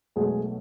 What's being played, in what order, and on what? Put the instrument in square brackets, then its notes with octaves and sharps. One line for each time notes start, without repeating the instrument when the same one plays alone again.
[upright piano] B1 B2 G#3 A3 G#4